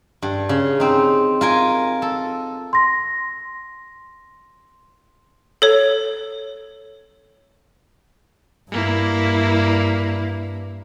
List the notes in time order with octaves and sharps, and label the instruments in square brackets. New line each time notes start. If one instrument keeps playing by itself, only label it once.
[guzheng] G2
C#3
C4 D#4
F4 A#4 G#5
A4
[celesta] C6 A#6
[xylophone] A4 C#5
[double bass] G2 [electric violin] A#3 E4